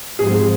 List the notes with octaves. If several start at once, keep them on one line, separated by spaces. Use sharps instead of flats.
G#2 F3 C4 G#4